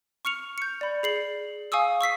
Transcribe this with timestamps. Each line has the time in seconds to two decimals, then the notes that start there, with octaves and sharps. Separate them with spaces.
0.25 C#6 F6 C#7 F7
0.58 G6 C#7
0.81 D5 B5
1.03 G#4 C7 F#7
1.72 F5 G#5 C#6 D#6 E6
2.01 C#6 E6 B6 C7